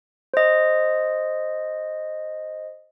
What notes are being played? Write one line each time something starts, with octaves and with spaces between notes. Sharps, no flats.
C5 D#5